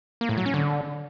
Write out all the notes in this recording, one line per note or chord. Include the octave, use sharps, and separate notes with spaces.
A#3
A2
F#3
C#4
D3